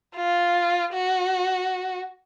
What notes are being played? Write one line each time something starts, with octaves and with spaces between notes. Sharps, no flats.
F4
F#4